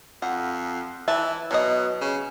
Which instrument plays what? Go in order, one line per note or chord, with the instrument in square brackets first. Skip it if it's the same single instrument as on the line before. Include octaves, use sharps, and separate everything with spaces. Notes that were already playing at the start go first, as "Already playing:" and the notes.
[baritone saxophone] F2 [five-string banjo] F#5
[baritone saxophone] E3 [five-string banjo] E5 A5
[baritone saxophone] B2 [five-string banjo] F#3 D#5
[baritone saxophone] C#3